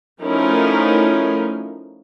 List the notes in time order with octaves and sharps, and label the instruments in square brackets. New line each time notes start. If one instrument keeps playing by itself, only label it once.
[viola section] F3 A3 C#4 D#4 E4 A#4